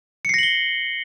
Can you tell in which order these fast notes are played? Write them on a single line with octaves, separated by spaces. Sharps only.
C#7 C7 A#6 F#7 G7